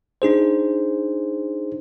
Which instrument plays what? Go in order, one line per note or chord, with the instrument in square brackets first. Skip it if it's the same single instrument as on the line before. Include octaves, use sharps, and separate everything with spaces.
[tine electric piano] D4 D#4 G#4 C5